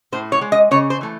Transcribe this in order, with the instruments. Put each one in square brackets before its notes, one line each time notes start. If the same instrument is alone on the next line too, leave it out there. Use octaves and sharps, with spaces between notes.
[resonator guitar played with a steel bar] A2 C5
C#5
G#3
D#5
C#3 C#5
C5
E3 A3